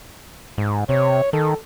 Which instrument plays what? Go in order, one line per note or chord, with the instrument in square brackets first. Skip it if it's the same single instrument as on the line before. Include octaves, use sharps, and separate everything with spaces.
[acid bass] G#2
[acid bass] C3 [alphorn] C#5
[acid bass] D#3 [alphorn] A4